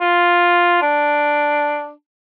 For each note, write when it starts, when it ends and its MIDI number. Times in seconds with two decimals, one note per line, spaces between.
0.01 0.80 65
0.82 1.91 62